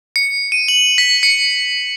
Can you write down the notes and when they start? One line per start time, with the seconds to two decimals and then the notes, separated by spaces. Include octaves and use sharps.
0.16 C#7
0.52 D#7
0.68 F#7
0.98 B6
1.23 C#7